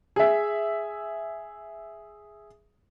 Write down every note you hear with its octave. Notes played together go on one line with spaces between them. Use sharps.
G#4 E5